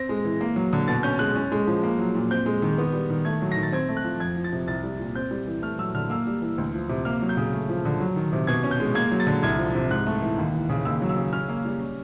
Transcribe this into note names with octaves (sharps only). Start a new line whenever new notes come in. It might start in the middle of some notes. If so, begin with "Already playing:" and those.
Already playing: C4 A#6
G#3
E3
A#3
F#3
D3
B2 A6
C#4 G6
G#3 F#6
C#4
G#3
F3
A#3
F#3
A#2
C4 G6
G#3
D#3
B3
G3
D#3
A3 G#6
F#3
D#3 A#6
A6
C4 G#6
A3
F#6
F3
F2 G#6
F3
A6
C3
C2 A6
G3
A#2
C4 G6
G3
E3
A3 F6
F#3 E6
D3 F6
A#3 E6
G3
E3
D2
F3
C3
A#3 F6
F#3
G6
C#3
A3
F3
D3
F#3
D#3
C3
B2 G#6
C#4
G6
G#3
A#3 G#6
F#3
A6
D3
C2 G#6
F3
C3
G#2 F#6
A3
E3
D#2
E3
C#3
D#2 E6
F#3
E6
C#3
C#4 F6
A#3
G3
C#4